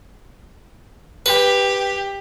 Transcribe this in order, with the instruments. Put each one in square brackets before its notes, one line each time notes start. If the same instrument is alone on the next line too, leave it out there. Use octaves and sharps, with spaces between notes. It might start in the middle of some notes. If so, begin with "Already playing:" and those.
[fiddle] G4 [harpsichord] B4